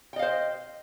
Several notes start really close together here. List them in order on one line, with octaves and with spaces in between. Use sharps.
G5 D#5 F5 C5